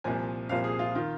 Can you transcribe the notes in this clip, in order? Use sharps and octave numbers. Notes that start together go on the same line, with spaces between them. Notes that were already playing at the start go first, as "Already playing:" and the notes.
C2 A#2 F3 G#5
C2 A#2 F3 F5
G#4
F4
D#3 F4